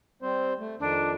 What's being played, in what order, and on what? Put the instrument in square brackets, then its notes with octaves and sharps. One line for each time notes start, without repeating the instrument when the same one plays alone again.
[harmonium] G3 C4 C5
A3
[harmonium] F2 D#3 [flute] D4